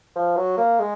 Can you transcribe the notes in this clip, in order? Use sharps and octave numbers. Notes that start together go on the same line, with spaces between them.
F3
F#3
A#3
G#3